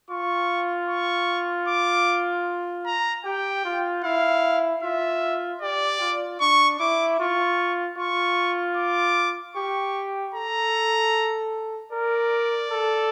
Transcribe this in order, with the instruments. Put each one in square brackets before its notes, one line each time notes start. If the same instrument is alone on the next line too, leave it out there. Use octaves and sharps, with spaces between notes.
[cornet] F4 [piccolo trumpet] C#6
[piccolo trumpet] C#6
D6
A#5
[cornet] G4 [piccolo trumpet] G5
[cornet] F4
[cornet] E4 [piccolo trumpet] F5
[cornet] F4 [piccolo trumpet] E5
[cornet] G4 [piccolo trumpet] D5
[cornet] F4
[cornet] D4 [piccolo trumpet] C#6
[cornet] E4 [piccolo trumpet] D6
[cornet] F4 [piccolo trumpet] C#6
[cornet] F4 [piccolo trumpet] C#6
[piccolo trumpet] D6
[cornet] G4 [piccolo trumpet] C#6
[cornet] A4 [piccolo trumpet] A#5
[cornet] A#4 [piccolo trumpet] D5
[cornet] A4